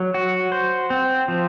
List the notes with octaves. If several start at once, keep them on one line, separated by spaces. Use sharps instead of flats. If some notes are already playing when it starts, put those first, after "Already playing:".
Already playing: F#3
F#4
C5
C4
F3